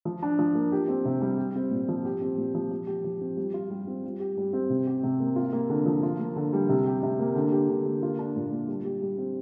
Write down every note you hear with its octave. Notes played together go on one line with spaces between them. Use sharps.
F3
D4
F3
A#3
G4
C4
C3
G3
G4
C4
A#2
F3
G4
C4
A#2
F3
F3
G4
F3
C4
G3
F4
G3
C4
G3
G4
G3
C4
C3
G4
C3
A#3
F4
A#3
D3
F3
F4
A#3
D3
G3
C3
G4
C3
A#3
D3
G4
D3
A#3
F4
D4
A#2
A#3
G3
G4
G3
C4